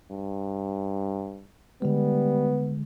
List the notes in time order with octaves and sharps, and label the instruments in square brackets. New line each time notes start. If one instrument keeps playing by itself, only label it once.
[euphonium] G2
[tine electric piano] D3 G#3 [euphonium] G3 [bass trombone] B3